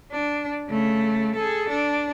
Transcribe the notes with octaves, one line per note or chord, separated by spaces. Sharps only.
D4
C#3 A3
G#4 A4
D4